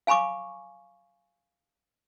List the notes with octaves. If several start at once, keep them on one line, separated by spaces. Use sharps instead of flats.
F5 G#5 B5 C#6 D6